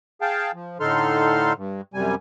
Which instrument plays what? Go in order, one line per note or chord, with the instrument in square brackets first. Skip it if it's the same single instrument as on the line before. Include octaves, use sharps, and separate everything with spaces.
[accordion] G#4 F5 G5 A5
F3
A2 D3 D#4 A4 C6 F6
G2
F#2 C3 G3 G#5